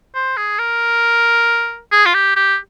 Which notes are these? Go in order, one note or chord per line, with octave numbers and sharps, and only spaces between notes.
C5
G#4
A#4
G#4
F4
G4
G4